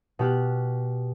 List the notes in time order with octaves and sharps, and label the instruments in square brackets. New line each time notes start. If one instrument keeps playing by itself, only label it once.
[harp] B2 G4 F6 F#6